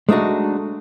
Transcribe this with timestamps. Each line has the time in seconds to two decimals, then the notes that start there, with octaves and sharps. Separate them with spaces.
0.09 G#3 A3 D4 D#4 F#4